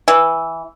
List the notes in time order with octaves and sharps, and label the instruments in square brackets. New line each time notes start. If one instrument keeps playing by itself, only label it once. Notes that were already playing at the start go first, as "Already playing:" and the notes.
[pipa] E3